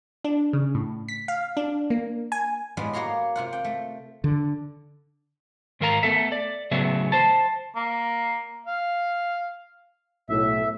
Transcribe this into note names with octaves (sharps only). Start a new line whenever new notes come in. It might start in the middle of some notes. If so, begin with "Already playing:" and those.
D4
C#3
A2
B6
F5
D4
A#3
G#5
A2 G3 G#3 B3
A#3 F#4 C#5 A#5 C6
C3 F4 F#5
G5
A3
D3
G#2 D#3 A#4 F5 A#5
A3 B3 A4 E5
D5
A2 C#3 F#3 B3 E5
C5 A5
A#3
F5
B1 A2 E5